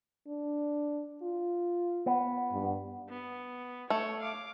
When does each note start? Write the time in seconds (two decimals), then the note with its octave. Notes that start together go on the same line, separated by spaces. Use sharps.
0.28 D4
1.22 F4
2.06 B3
2.52 G2
3.09 B3
3.90 A3 C#5
4.21 F5 D6